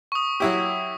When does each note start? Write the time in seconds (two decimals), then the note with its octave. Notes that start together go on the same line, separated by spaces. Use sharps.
0.12 C#6 D#6
0.40 F#3 E4 G4